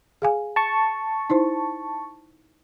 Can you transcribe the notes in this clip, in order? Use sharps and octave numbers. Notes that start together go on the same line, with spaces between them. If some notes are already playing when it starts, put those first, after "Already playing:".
G#4 F5 G#5
A5 C#6
D#4 E4 C5